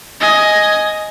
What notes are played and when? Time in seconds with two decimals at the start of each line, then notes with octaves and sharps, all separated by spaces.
0.21 D#5 G#5